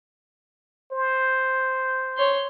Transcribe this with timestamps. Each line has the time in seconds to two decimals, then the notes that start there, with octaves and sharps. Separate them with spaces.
0.92 C5
2.17 C#5 C6